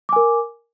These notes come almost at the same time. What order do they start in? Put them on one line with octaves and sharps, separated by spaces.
D6 G#5 A#4